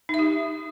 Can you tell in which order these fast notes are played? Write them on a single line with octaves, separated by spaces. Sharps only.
D#4 E5 G4